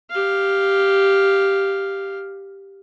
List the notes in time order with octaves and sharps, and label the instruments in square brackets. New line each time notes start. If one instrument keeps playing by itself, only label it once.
[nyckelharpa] G4 F5